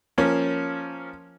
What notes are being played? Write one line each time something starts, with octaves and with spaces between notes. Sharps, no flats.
F3 A#3 C#4